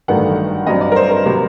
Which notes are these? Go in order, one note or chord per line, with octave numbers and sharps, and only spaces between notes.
A1 G2 D#3 F#3 A3 F#5
G2 F#3 C4 D#5
D5
A#4
C5
A#4
C3 F#3 A#3